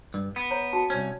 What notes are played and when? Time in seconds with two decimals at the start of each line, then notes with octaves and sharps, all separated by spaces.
0.14 G2
0.36 B3
0.51 C#5 A#5
0.73 F#4 A5
0.90 C2 C#4 C#5